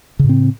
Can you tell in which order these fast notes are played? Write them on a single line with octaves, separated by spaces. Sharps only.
C#3 A2 C4